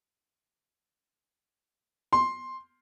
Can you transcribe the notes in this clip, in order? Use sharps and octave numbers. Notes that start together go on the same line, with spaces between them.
C6